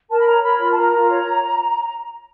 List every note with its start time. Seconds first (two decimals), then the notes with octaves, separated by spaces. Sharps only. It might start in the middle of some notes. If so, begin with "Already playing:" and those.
0.09 A#4 A5
0.18 B5
0.25 C#5 A#5
0.42 A#4 B5
0.59 F4
0.71 A5
0.75 A#4 A#5
0.92 F4
1.09 C#5